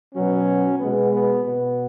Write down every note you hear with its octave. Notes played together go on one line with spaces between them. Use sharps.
B2 F#3 B3 C#4
B2 G#3 B3
B3
B2 B3